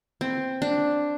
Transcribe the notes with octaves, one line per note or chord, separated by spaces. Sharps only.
C4
D4